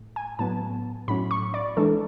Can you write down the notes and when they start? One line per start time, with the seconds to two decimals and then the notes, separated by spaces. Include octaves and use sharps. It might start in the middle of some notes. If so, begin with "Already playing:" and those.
Already playing: A2
0.16 G#5
0.39 A2 F#3 B3 A5
1.08 A2 F#3 C#4 B5
1.31 C#6
1.54 D5
1.77 E3 G#3 D4 A4